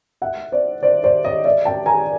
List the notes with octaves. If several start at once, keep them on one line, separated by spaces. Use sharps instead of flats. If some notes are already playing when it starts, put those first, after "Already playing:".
E5 F#5
C5 D5
C5 D5
C5 D5
C#5 D#5
D5 E5
G5 A5
G#5 A#5